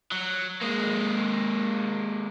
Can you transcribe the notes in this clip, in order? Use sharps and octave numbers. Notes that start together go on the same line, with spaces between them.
F#3
G#3 A#3